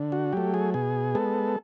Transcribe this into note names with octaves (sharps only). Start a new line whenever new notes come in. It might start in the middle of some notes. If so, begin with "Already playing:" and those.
Already playing: D3
F#4
F#3 A3 G4
G#4
B2 G#4
G#3 B3 A4